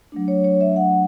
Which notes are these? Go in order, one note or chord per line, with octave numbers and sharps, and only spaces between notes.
F#3 A3 D4
C#5
C#5
E5
F#5